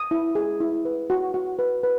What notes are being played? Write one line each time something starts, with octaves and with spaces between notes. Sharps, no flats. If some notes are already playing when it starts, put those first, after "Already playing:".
Already playing: D#6
E4
G#4
E4
B4
F#4
F#4
B4
B4